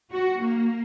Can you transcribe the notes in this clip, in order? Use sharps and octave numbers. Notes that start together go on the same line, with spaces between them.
F#4
A#3